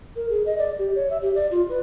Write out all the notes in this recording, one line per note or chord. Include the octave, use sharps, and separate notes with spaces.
A#4
G#4
D#5
D5
G4
C#5
E5
G4
D5
F4
B4